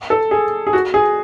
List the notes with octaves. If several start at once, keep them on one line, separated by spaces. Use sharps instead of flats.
A4
G#4
G#4
F#4
G#4